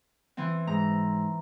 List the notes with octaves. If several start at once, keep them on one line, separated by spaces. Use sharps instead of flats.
E3 C4
G#2 A#5